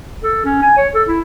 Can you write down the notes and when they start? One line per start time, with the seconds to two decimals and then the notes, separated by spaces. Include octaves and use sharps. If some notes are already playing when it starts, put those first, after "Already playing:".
0.23 A4
0.45 C#4
0.62 G#5
0.77 C#5
0.95 A4
1.08 E4